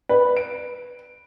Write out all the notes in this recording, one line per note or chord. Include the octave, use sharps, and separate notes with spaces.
B4
D7